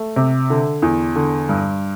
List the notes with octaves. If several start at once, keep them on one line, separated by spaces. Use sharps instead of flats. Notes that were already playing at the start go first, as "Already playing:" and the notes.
Already playing: A3
C3
D3
E2
D3
G2